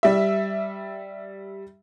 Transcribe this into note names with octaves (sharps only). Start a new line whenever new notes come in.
G3 E5